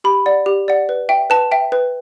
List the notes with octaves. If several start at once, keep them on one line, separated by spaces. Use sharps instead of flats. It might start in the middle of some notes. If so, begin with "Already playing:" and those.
G4 B5
D5 F#5
G4
D5 F#5
B4
E5 G5
B4 A5
E5 G5
B4